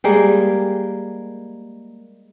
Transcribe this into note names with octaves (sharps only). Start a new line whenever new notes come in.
G3 G#3 A#3